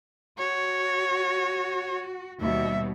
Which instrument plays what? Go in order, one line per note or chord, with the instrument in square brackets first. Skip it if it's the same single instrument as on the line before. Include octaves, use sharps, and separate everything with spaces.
[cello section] F#4 [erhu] C#5
[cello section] D#2 B2 G3 [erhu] E5